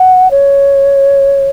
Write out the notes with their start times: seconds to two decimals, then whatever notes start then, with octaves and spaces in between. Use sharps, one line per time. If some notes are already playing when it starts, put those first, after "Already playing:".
Already playing: F#5
0.30 C#5